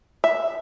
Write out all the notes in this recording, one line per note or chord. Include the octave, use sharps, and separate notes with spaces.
E5